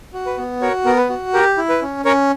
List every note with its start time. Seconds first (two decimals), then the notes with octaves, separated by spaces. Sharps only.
0.13 F#4
0.26 B4
0.38 B3
0.61 F#4 A#4 C#5
0.85 B3 A#4
0.97 B4
1.10 F#4
1.34 G4 A#4
1.57 E4
1.69 B4
1.82 C#4
2.05 C#4 A#4 C#5